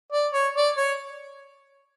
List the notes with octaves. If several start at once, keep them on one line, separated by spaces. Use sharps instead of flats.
D5
C#5
D5
C#5